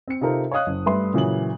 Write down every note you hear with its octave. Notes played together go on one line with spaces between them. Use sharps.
C4 C#7
C3 D#4 F4 A4 A#4 C5
C#5 D#5 F5 D#6 F#6
F#1
G2 A3 B4 E5 C6
A#2 C#3 E3 F#3 D#6 F#7